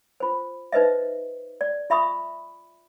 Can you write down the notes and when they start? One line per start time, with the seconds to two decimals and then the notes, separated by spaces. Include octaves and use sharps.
0.20 F4 C5
0.72 D#4 B4 C5 D#5 E5
1.61 D5
1.90 F4 E5 B5 C#6 D#6